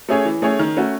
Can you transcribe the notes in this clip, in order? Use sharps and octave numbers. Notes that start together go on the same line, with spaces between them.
A3 C#4 G#4 C#5
E3
A3 C#4 G#4 C#5
D#3
A3 C#4 F#4